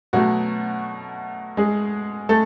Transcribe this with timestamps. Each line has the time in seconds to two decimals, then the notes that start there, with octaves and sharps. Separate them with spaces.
0.13 B2 F#3 A3 F#4
1.57 G#3 G#4
2.29 A3 A4